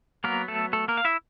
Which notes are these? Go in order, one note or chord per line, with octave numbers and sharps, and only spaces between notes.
F#3 A#3 B3 A#4
A3 A4
A3 A4
A#3 A#4
F5
E4 E5